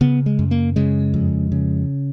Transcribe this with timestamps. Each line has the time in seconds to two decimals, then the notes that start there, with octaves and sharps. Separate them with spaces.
0.01 C#3 B3
0.26 G#3
0.39 F#2
0.51 A#3
0.76 C#3 G#3
1.14 F2
1.52 C#3